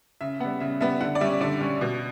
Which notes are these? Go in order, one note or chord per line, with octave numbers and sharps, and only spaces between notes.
C#3 E5
G3 B3 F#5
C#3 E5
G3 B3 E5
D3 F#5
D5
G3 C#4 E5
D3 D5
G3 C#4
B2